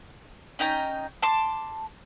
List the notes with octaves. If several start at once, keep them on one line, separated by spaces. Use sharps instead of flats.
C#4 D#4 G5 A#5
A5 C6 D6